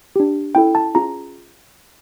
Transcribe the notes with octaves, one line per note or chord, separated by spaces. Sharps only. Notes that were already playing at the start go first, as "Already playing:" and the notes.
D4 G4
C#4 E4 A4 G5
A5
C#4 F4 G#4 A#5